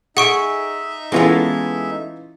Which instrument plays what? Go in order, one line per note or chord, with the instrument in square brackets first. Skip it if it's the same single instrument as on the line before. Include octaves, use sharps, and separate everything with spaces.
[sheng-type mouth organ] D#4 E5 [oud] G#4 [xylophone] F#5 C#6 D7
[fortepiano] E3 C#4 F4 [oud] G#3 B3 A4